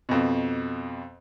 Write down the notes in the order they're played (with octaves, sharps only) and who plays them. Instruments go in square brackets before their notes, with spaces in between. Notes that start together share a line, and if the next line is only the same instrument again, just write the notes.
[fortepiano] F2 B2